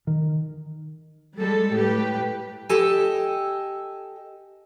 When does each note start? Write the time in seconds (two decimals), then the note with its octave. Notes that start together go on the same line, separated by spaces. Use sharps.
0.07 D#3
1.37 G3 G#3 A4
1.74 A2 G4 B4
2.69 G4 A4 D#5 G#5